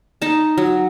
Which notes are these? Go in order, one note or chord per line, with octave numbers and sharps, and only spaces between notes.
D#4 A5
F#3